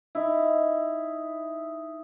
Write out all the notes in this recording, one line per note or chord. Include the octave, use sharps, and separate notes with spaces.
D#4 E4